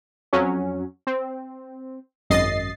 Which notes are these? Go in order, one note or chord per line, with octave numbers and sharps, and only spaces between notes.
F2 F#3 C#4
C4
G#1 F#2 D#5 A6 C7